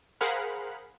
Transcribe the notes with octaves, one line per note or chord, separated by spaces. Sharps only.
G#4 A#4 C5 F5 F#5 B5